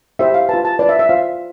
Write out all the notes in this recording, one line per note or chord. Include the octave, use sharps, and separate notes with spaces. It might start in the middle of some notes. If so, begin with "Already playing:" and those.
E4 G4 C5 E5
F5
F4 B4 A5
A5
E4 B4 D5
E5
E5
F4 C5 F5